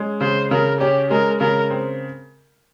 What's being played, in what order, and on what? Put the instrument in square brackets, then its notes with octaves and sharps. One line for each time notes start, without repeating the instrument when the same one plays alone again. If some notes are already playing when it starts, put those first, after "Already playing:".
Already playing: [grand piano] G#3 C#4
[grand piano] C#3 [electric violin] C5
[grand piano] C#3 [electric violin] A#4
[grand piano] C#4 [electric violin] G4
[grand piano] G#3 [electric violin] A#4
[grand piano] C#3 [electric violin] A#4
[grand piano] C4